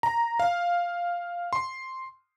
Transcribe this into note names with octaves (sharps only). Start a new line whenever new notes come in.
A#5
F5
C6